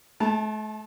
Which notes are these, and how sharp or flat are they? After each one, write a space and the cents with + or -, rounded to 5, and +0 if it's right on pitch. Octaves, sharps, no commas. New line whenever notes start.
A3 -40 A5 +0